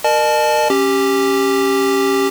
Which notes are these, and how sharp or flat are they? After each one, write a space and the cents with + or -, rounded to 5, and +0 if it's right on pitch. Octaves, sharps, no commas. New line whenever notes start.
A#4 +0 D#5 -45 A5 -30
C#4 -15 G4 +0